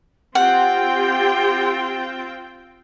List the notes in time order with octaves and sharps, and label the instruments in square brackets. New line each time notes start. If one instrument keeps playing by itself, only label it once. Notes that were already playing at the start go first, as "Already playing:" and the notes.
[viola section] C4 F4 G5 [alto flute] G4 [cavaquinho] F#5